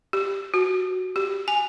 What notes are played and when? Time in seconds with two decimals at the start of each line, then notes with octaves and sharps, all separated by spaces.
0.13 G4
0.54 F#4
1.16 G4
1.48 G#5